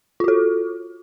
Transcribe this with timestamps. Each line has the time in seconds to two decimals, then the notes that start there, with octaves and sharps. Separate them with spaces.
0.20 F4
0.24 F#4
0.28 A4